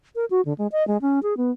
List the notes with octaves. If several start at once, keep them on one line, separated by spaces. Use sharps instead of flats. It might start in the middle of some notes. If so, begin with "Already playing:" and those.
A#4
F#4
D3
G#3
D#5
G#3
C#4
G#4
B3